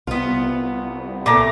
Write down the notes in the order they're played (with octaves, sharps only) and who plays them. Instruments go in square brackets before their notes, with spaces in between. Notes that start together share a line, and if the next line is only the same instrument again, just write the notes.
[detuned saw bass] C2 [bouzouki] B3 F4
[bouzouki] A#2 B3 [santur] A3 A#5 D6